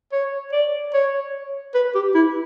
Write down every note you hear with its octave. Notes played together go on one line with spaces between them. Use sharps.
C#5
D5
C#5
B4
G4
E4